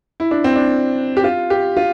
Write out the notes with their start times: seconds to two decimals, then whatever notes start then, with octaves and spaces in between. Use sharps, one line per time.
0.20 E4
0.31 D4
0.44 C4
0.56 D4
1.17 G4
1.24 F4
1.50 G4
1.77 F4